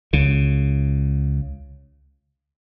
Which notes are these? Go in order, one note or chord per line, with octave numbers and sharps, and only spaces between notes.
C#2 C#3